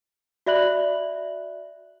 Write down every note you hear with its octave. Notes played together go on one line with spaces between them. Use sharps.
F#4 D5 E5 B5 F#6 F#7